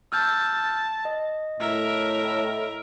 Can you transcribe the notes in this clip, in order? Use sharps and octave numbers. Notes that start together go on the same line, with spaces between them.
A5 E6 F6 G6
D#5
A2 A#4 E5